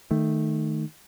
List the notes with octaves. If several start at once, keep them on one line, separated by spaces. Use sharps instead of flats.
D#3 A3